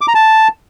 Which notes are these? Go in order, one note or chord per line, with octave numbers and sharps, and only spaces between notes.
D6
A#5
A5